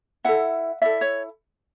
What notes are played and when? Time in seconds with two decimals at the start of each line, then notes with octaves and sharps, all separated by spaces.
0.24 E4 A4 E5 F#5
0.82 E4 A4 D5 E5
1.01 C#5